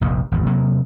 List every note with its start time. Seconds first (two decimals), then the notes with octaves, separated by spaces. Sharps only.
0.01 F1 A#1 F2
0.32 G#1 E2
0.46 C3 F#3 A#3